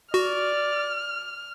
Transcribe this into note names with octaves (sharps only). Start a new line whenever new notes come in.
F#4 D5 F6